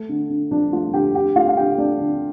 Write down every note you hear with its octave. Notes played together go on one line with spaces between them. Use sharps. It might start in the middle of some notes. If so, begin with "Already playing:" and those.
Already playing: A3
D3
D3
F3 D4
A3 F4
D3 G4 G5
D3 G4 G5
A3 F4 F5
F5
D3 G4 G5
A3 D4 D5
D3